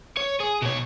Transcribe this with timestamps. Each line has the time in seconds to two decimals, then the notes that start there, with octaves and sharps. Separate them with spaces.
0.17 C#5
0.40 G#4
0.62 B2 C#5